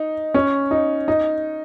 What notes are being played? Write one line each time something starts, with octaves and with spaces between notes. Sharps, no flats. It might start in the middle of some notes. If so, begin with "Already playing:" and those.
Already playing: D#4
C#4
D#4
D#4